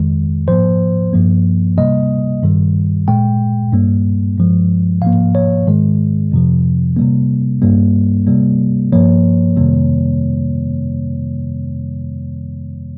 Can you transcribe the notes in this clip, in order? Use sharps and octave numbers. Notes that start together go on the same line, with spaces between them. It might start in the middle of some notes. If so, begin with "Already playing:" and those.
Already playing: F2 D#3 G#3
G#2 F3 A#3 C5
G2 F3 A#3
C3 G3 A#3 D#5
G2 D#3 G3
A#2 G#3 G5
G2 G3 A#3
G2 F3 G#3
G#2 F3 A#3 F5
C#5
G#2 D#3 G#3
F2 C3 F3
C3 G3 A#3
G2 G3 A#3
C3 G3 A#3
G2 F3 A#3 C#5
F2 C3 D#3 G3 A#3